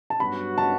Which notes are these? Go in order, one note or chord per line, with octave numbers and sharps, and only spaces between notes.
A5
G2 F#3 B3 F#4 B5
A5